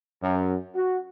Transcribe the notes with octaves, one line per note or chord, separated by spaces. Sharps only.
F#2
F#4